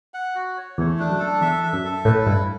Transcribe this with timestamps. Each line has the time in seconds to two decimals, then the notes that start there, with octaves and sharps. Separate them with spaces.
0.14 F#5
0.35 F#4
0.57 C#5
0.78 E2 A3
0.99 D4
1.10 F#2
1.20 A4
1.41 E2 E5
1.63 E5
1.73 F#2
1.85 A4
2.05 A2 B4
2.26 G2 E4